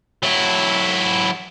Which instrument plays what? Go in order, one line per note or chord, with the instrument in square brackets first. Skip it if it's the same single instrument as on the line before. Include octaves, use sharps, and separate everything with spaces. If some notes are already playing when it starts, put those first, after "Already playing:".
[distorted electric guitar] F#3 E4